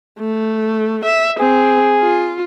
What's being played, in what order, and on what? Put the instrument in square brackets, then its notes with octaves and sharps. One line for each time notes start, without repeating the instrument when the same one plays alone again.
[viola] A3
E5
[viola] C4 [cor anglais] G#4
[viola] F4